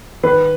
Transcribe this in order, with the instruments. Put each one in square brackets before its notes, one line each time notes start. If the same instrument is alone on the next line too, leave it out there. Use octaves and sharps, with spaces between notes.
[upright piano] D#3 B4